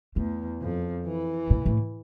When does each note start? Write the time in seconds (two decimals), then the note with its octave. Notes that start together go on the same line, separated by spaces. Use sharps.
0.16 E2 A3
0.61 F2
1.06 E3
1.50 A#2
1.66 A2